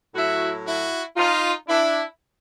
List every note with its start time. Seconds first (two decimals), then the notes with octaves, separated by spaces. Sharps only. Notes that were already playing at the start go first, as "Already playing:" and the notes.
0.14 A2 F#3 E4 F#4
0.65 E4 F#4
1.16 D#4 F4
1.67 D4 E4